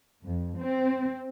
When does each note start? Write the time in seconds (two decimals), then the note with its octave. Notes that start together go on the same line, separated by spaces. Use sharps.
0.25 F2
0.57 C4